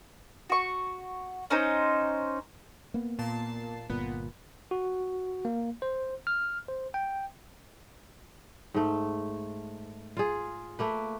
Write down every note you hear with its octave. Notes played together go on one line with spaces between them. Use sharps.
F#4 C#6
C#4 D#4 C5
A#3 B3
A#2 A5 C7
G1 A#2 B3
F#4
A#3
C5
F6
C5
G5
G#2 A3
F4 G#4
A3 A#3 B4